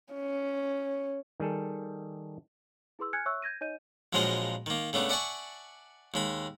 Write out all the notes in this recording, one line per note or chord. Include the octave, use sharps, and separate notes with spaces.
C#4
D#3 G3 G#4 A4
E4 G#4 B4 C6 E6
G#5 F6 F#6 G#6 C#7
C#5 E5 C#6 E6 F#6
G6 G#6 A#6 D#7
D#4 C#5 D#5 G6 D#7
A#1 F3 F#3 G#3 F4 D#5
D#3 A#3
C#3 A3 B3 D4
D5 E5 F#5 G#5 A5 C#6
D#2 G#3 B5